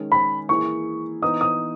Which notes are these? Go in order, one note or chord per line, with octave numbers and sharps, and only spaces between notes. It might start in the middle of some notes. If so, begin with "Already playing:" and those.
Already playing: D#3 G#3 C#4 G#4
B5
E3 A#3 E4 G#4 C#6
E3 B3 D#4 D#6
D#6